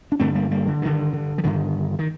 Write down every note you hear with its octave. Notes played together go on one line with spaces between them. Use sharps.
D4
G2 D3 A3 C4
G3 A#3
G3 A#3
D3
G2 D3 D#3
D3
F3
G2 D3 D#3
D#3